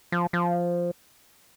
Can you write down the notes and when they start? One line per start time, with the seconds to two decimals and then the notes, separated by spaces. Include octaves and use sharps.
0.12 F3
0.33 F3